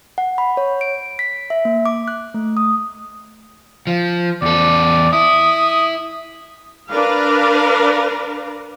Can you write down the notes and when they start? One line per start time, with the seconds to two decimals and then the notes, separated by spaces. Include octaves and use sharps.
0.18 F#5
0.38 B5
0.57 C#5
0.81 D7
1.19 B6
1.50 E5
1.65 A#3
1.86 D6
2.08 F#6
2.34 A3
2.57 D#6
3.87 F3
4.42 E2 A4 D5
5.13 E4 D#6
6.90 D4 A#4 B4 D5 F5